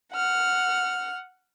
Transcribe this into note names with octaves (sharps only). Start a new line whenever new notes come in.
F#5 F6